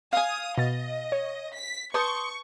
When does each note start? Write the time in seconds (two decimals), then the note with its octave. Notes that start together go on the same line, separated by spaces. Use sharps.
0.13 F5 G#5 D#6
0.58 B2 D#5 A6
1.12 C#5
1.54 B6
1.94 B4 A5 C6 C#6 D#6 G6